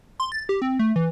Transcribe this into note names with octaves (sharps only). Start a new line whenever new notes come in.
C6
A6
G4
C4
A3
E3